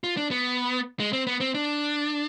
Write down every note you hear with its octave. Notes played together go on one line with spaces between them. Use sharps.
F4
D4
B3
G#3
C4
B3
C4
D4